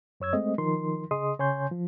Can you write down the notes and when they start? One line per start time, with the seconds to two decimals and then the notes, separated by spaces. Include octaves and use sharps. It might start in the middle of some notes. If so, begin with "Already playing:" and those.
0.20 F#2 C#5 E6 G#6
0.33 G#3 A3 C4 D#5
0.58 D#3 F3 D#4 A#4 C6
1.11 C#3 G#4 D#5 C6 D#6
1.39 C#3 C#5 G#5 C6 G6
1.72 F3